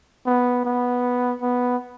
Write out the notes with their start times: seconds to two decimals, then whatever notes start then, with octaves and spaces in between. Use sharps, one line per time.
0.26 B3
0.65 B3
1.42 B3